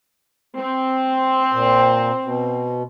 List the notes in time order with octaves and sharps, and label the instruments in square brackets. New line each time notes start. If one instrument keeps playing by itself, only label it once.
[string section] C4
[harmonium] A#2
B2